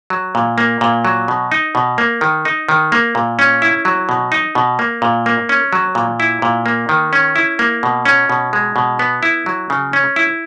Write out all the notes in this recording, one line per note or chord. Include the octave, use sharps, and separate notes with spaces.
F#3
A#2
A#3
A#2
F#3
B2
D#4
B2
A#3
D#3
D#4
D#3
A#3
A#2
C#4
E4
F#3
B2
D#4
B2
A#3
A#2
A#3
C#4
F#3
A#2
E4
A#2
A#3
D#3
C#4
E4
A#3
B2
C#4
B2
G#3
B2
B3
E4
F#3
C#3
C#4
E4